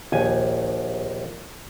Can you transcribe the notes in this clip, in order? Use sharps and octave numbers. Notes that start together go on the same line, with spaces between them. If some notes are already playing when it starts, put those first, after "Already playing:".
A#1 D#2 G#5